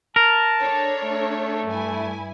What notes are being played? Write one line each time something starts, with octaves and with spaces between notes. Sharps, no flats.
A#4 A5
D4 A4 C#5
A3
G2 E4 G#5